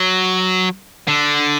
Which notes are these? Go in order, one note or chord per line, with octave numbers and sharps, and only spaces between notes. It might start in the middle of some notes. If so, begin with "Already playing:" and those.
Already playing: F#3
D3